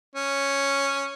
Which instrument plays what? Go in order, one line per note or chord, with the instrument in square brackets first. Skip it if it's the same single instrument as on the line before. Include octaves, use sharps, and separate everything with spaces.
[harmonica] C#4